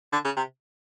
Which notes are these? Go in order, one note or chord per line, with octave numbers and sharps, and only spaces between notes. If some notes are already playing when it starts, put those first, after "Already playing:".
D3
C#3
C3